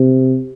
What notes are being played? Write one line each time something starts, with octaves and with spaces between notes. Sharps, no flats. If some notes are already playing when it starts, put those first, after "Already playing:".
Already playing: C3